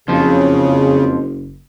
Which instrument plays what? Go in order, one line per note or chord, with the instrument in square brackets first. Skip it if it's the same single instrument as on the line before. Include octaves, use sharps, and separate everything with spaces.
[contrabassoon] F#1 [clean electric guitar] F2 F3 [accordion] C#3